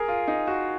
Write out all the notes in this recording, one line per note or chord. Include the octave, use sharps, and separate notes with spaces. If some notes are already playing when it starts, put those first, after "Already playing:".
Already playing: G#4 A#4
F4
D#4
F#4